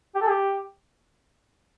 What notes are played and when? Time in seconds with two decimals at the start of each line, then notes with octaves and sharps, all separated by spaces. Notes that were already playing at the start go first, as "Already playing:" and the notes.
0.15 G4
0.22 A4
0.29 G4